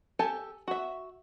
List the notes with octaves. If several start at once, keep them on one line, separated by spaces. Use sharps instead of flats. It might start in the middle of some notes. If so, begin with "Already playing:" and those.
G4 A4 G#5 A5
F#4 E5